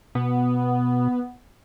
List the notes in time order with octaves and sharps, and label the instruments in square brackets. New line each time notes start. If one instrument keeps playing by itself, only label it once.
[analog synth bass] B2 [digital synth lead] B3